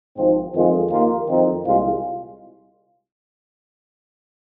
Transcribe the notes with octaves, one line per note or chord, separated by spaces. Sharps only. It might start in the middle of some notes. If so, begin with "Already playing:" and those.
G#1 G#2 F3 C4
F2 D#3 G#3 C4 F4
D#2 D#3 A#3 F4
F2 D#3 C4 D#4
C2 A#2 G#3 F4